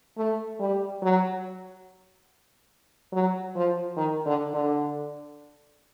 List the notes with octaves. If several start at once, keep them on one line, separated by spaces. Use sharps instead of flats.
A3
G3
F#3
F#3
F3
D#3
D3
D3